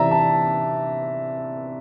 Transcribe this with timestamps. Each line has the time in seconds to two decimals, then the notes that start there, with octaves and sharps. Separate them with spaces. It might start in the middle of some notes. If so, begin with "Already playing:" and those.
Already playing: C3 E3 D5 E5 A#5
0.11 A5